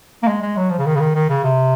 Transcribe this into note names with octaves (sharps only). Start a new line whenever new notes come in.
A#3
G#3
G#3
F#3
F3
C#3
D#3
C#3
D#3
D#3
C#3
C3